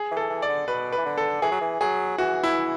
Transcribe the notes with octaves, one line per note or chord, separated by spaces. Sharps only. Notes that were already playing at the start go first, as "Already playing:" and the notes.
Already playing: G#4
E3
A4
E3
D5
D3
B2 B4
B4
E3
D3
A4
E3 G#4
F#3
E3
F#3 G#4
E3 F#4
E4